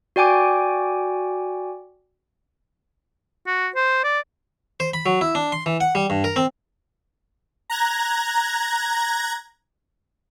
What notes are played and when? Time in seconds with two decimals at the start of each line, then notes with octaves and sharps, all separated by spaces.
0.16 F#4 D5 G5 G#5 D6
3.47 F#4
3.75 C5
4.04 D5
4.80 C5
4.94 B5
5.06 F#3
5.21 E4
5.35 D4
5.52 C6
5.66 E3
5.80 F#5
5.95 G3
6.10 G2
6.24 A#4
6.36 C4
7.70 A#5 F#6 G#6 A#6